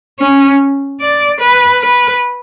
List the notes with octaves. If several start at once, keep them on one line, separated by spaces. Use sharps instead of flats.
C#4
D5
B4
B4